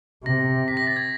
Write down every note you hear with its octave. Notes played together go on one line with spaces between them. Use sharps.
C3 A#6
B6
A#6
A6
G#6